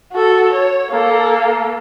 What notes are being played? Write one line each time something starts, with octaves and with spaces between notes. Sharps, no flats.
F#4 A4
C#5
A#3 A4